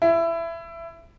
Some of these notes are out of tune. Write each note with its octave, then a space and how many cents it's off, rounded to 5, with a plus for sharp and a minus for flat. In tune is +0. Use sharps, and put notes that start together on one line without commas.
E4 +20